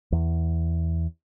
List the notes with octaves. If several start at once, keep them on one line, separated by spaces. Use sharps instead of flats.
E2